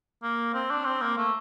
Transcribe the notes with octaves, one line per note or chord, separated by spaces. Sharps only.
A#3
C4
D4
C4
A#3
A3